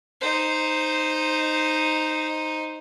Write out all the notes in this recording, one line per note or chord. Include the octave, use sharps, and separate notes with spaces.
D#4 C5